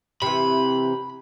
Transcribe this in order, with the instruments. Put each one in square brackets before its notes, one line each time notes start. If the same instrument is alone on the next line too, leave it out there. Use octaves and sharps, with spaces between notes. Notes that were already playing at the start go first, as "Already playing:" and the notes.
[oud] C3 E3 [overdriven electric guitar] B5